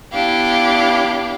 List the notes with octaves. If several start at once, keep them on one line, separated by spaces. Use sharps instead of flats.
B3 D4 E4 G4 F5